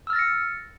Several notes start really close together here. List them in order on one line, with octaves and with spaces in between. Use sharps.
E6 F6 A6 A#6 C#7